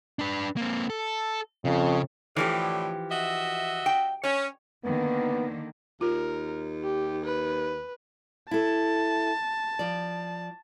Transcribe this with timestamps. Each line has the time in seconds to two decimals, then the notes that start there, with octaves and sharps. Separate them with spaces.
0.19 D4 B4
0.57 A#3 C4
0.90 A4
1.65 F2 C#3
2.36 A2 D3 E3 F3 G4
3.11 F#4 D#5 E5
3.86 G5
4.23 C#4 C#5
4.84 D3 D#3 A#3 B3
6.01 D#2 F4 A#4
6.84 G4
7.25 B4
8.51 E4 A4 A5
9.79 F3 D5